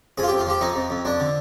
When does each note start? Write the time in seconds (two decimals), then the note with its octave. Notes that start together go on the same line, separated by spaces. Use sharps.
0.18 F2 G#4
0.23 F4
0.28 F2 G4
0.39 F4
0.47 F3 G4
0.61 F2 D#4
0.76 F2
0.90 F2
1.05 F2 D4
1.20 D3